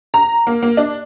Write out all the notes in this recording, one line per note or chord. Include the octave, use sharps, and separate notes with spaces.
A#5
A#3
A#3
D4